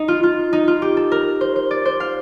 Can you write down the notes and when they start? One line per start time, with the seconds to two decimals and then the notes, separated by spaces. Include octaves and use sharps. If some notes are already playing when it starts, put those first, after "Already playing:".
Already playing: D#4
0.08 F4
0.23 F4
0.53 D#4
0.68 F4
0.82 G4
0.97 A4
1.12 A#4
1.41 C5
1.56 C5
1.71 D5
1.85 C5
2.00 F5